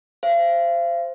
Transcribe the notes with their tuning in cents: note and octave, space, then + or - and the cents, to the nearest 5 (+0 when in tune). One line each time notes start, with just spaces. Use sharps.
C5 +0 F5 -40